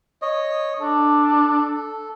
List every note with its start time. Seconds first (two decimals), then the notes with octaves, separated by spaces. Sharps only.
0.22 C#5 D#5
0.80 D4 A4